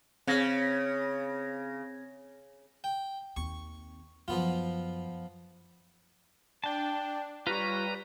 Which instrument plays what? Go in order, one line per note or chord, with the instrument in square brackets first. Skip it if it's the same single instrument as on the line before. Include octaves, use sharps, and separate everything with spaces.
[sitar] C#3 [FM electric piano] C4 G#6 A#6
[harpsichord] G5
[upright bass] D#2 C4 [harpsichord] C#6
[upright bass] F#2 [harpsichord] F3 B3 F4
[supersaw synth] D4 [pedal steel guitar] G5 A5
[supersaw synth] G3 [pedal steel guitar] F4 C#5 [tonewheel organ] B4 A#5